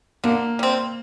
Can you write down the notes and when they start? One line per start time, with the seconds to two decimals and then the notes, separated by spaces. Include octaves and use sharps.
0.24 D3 A#3
0.59 G3 C4